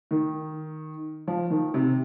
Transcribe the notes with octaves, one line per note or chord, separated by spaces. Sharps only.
D#3
F3
D#3
C3